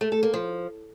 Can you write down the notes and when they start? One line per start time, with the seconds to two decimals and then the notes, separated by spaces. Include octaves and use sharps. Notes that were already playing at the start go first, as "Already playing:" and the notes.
0.01 A3
0.12 A4
0.23 A#3
0.34 F3